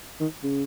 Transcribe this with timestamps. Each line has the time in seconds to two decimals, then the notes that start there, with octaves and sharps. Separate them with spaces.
0.20 D#3
0.43 C#3